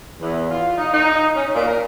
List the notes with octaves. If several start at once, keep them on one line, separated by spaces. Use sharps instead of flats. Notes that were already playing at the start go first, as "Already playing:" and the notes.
E2
F4
D#4
D#4
C#4
A#2
A#4